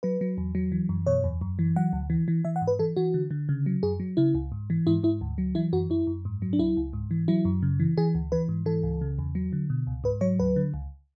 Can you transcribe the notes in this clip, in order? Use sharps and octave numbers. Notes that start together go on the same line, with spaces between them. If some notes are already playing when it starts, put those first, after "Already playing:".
F#3 B4
F#3
E2
F#3
E3
F#2
B2 C#5
E2
F#2
E3
F#3 F#5
D2
E3
E3
E3 E5
F#5
G#2
B4
E3 A4
E3 F#4
D3
D3
C#3
F#3
F#2 G#4
F#3
C#3 E4
C#2
G#2
E3
G#2 E4
G#2 E4
D2
F#3
E3 E4
F#2 F#4
F#2 E4
F#2
G#2
F#3
D4
C#2 E4
C#2
G#2
E3
F#3 E4
F#2
C#3
E3
E3 G#4
D2
E3 B4
G#2
E3 A4
C#2
C#3
E2
F#3
D3
B2
C#2
G#2 B4
F#3 C#5
D2 B4
D3
C#2